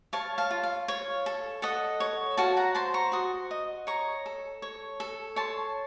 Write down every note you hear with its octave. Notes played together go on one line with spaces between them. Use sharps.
C#5 F5 A5
F5 A5
F4
F5
C#5
A4
A4 D#5 F#5
C#5
F#4 F5 A5
F#5 A#5
C5 A5 C6
A#5 C#6
F#4 C6 D#6
D#5
C#5 A#5 C#6
A4
C#5
A4
C#5 A5 C6